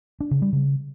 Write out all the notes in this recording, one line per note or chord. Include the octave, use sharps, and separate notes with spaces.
D4
C#3
G3
C#3